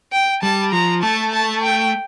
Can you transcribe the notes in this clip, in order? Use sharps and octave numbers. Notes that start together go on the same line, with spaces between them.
G5
G3 A5
F3 A#5
A3 A5
A5
G5